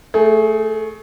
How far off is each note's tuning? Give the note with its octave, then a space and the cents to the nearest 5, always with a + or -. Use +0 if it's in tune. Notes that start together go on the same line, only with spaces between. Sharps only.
A3 +0 G#4 +25